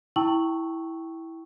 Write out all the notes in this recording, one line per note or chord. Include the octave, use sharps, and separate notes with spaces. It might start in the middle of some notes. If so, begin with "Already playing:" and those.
E4 G5 A5 C#6 E6 F#7